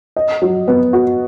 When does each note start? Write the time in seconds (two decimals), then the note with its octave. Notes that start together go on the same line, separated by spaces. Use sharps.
0.16 D#5
0.42 F#3
0.68 B3
0.93 F#4